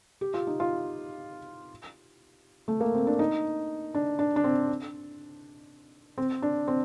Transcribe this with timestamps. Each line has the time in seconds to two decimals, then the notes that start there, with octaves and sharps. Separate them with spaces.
0.21 G4
0.34 F4
0.47 D#4
0.60 F4
2.68 A3
2.81 A#3
2.94 C4
3.07 D4
3.19 D#4
3.95 D4
4.19 D4
4.36 D4
4.44 C4
6.18 C4
6.42 D4
6.68 C4